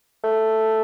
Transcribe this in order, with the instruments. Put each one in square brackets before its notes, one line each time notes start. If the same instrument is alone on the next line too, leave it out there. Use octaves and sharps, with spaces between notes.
[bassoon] A3